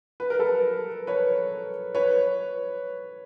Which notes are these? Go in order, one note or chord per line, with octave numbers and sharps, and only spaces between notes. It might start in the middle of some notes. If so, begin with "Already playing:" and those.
B4
A#4
A4 B4
B4 C#5
B4 C#5